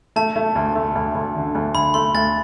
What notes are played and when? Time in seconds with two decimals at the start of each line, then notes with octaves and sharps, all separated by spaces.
0.16 A3 A5
0.36 A3
0.55 D2
0.75 A3
0.95 D2
1.15 D2
1.35 D3
1.55 D2
1.75 D2 B5
1.94 A3 C6
2.14 D2 A6